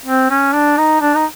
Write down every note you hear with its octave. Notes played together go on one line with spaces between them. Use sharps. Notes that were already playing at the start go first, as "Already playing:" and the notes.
C4
C#4
D4
D#4
D4
D#4